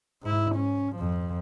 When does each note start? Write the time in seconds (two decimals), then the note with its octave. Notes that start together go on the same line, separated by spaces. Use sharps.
0.23 G#2 E4
0.56 C#4
0.96 F2 F3